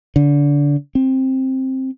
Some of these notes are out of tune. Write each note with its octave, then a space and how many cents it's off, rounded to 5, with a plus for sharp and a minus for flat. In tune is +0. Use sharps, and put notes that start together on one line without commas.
D3 -25
C4 +10